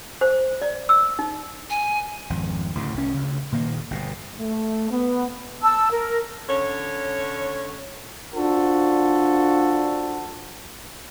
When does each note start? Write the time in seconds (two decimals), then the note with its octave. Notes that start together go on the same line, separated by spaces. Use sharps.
0.21 C5
0.62 D5
0.89 E6
1.19 D#4
1.70 G#5
2.30 G#1 F2
2.75 D2 A2 C#3
2.94 C2 C#4
3.14 D2 C#3
3.52 A#2 D#3 A#3
3.91 G1 B2
4.39 A3
4.91 B3
5.63 A5 E6
5.91 A#4
6.48 D3 C#4 C#5
8.35 D4 F4 F#4 A4 C5